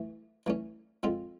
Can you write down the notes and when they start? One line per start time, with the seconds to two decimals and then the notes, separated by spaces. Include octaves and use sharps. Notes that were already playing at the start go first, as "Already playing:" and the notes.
Already playing: E3 A3
0.46 E3 A3 C#4
1.03 F3 G#3 C4 F4 A4